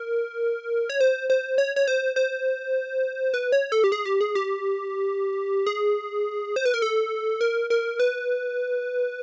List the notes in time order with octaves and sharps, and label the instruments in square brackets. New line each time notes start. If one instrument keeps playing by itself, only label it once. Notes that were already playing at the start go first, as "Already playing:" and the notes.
Already playing: [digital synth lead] A#4
C#5
C5
C5
C#5
C#5
C5
C5
B4
C#5
A4
G4
G#4
G4
G#4
G4
G#4
C5
B4
A#4
A4
A#4
A#4
B4